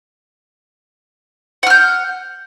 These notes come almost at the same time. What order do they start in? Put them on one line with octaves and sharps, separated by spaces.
F#5 F6 G6